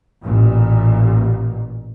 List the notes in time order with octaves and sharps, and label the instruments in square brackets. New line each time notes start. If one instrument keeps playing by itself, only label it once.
[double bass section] A1 A#2